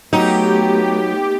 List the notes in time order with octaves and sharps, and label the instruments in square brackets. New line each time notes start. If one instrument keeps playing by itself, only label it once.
[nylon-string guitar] F#3 [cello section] A3 B3 [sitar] D#4 [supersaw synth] G4